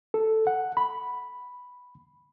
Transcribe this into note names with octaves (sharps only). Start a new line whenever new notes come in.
A4
F#5
B5